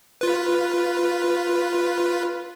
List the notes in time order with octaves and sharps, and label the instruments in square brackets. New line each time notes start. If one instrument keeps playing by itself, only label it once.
[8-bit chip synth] F4 B4